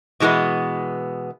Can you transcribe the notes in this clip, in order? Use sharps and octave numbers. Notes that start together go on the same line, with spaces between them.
B2 E3 G#3 A3 B3